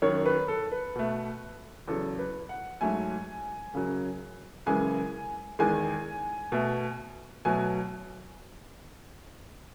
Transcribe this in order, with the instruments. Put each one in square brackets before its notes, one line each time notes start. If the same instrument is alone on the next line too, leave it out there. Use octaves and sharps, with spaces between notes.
[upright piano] F#2 D#3 F#3 C#5
B4
A4
B4
B2 A3
E2 C#3 F#3 A4
B4
F#5
G#2 F#3 A3 G#5
F#2 C#3 F#3
F#2 C#3 E3 G#3 G#5
E2 D#3 G#3 G#5
B2 A3
B2 F#3 A3 G#5